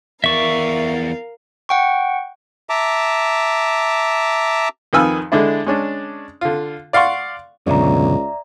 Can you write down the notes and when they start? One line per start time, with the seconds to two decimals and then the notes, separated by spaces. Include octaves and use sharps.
0.24 E2 A#4 D5 E5 F5 C#6
1.69 F#5 G5 C#6
2.70 E5 A5 A#5 D6
4.93 F2 D#3 B4 G#5 E6 F6
5.32 D3 G#3 D4 E4
5.66 G#3 C#4 D4
6.41 D3 F4
6.93 D5 F5 F#5 C6 C#6
7.67 C#2 F#2 B2 D3 D5 E5 A#5